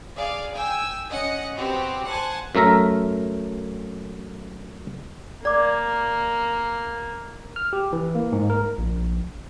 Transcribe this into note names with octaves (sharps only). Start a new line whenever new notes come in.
G#4 D5 F5
G5 G#5 E6
C#4 D#5 F#5 D#6 C#7
B3 C4 F#4 G4 C5
C5 F#5 G#5 A5
F#2 A3 A#4 E5 A#5
A#3 D5 D6
F6
G4
E3
A#3
G#2
A#4
A#1